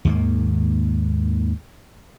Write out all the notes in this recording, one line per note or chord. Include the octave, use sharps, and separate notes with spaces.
D#2 G#2 D#3 A#3